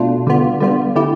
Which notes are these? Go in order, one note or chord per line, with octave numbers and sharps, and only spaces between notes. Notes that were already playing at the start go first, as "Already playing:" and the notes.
Already playing: B2 A3 D4 F4
D3 G3 B3 F4
D3 G3 B3 F4
D3 A3 E4 G4